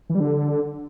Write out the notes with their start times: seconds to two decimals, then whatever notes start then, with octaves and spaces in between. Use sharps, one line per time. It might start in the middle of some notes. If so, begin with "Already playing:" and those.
0.10 E3
0.15 G3
0.20 D3